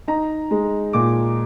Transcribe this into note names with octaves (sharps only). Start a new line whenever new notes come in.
D#4 A#5
G#3
A#2 D6